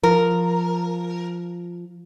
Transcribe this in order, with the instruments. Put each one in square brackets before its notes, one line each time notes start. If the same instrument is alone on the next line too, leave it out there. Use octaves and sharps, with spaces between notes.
[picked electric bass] F3 [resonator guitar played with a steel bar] A#4